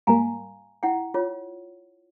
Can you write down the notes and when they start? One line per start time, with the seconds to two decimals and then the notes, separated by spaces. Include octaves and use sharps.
0.07 G#2 G3 A#3 F5 G#5 A#5
0.83 E4 F#5 G5
1.14 F4 C#5